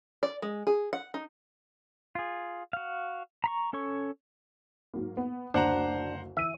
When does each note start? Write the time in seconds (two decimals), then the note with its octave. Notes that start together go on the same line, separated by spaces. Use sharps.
0.23 D5
0.42 G#3
0.67 G#4
0.93 F#5
1.14 D#4
2.15 F4 G#4
2.73 F#4 F5
3.44 A#5 B5 C#6
3.73 C#4 A4 C#5 C#6
4.94 G#2 F#3 A#3
5.17 B3
5.54 F#1 D2 D4 C5 F#5 A#5
6.37 E3 E5 D#7